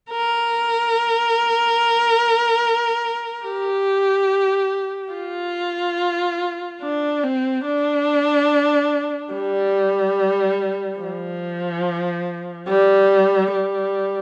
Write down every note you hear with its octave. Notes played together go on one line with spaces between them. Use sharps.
A#4
G4
F4
D4
C4
D4
G3
F3
G3
G3